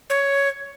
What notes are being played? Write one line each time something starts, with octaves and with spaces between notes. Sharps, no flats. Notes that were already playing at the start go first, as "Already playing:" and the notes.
C#5